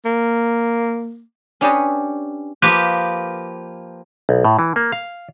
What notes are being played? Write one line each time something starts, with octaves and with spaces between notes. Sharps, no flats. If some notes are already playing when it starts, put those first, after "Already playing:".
A#3
C#4 D4 G4 B4 D#5 A5
F3 A#3 G4 B4
B1
A2
E3
A#3
F5